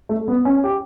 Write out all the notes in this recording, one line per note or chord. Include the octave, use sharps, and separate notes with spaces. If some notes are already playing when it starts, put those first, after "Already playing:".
A3
B3
C#4
G4